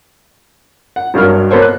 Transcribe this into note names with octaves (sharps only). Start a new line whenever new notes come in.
F#5
G#1 G2 F#3 A#4 F6
A#3 B3 A4 C5 C#5
F#6